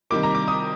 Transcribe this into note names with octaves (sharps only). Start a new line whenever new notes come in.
C3 D#3 G3 A#3 D6
A#5
D6
D#6